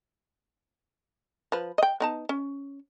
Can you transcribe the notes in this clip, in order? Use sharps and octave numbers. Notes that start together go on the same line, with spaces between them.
F3 B4
D#5 G5
B3 D#4 A5
C#4